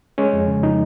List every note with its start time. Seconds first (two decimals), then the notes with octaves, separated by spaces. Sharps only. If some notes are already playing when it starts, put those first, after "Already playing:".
0.18 G#3 C#4
0.33 F2
0.48 C#3
0.63 F3 D#4